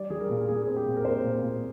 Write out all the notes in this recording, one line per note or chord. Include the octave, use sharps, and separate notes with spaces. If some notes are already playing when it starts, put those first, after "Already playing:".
Already playing: G3 D5
G3 G#4
A#4
A#2
A#2 G#4
C4 G#4
G4
A#2
A#4
C4 C5
A#2
A#2